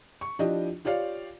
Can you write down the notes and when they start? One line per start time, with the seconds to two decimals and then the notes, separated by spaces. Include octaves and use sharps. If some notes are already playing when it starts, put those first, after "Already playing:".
0.21 C#6
0.39 F3 D4 E4 G4 D#5
0.85 F4 G4 C#5 D5 F5